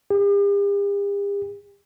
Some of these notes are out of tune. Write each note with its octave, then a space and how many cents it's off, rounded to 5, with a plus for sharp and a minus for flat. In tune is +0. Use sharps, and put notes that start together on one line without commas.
G4 +45